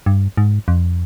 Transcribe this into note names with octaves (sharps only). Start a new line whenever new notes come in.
G2
G#2
F2